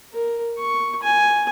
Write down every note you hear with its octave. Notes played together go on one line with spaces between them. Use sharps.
A#4
C#6
G#5